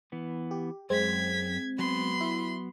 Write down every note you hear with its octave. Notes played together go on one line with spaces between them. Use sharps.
E3 B3
G4
F#2 G#3 C4 G#6 B6
F#3 B3 B5 C6
E4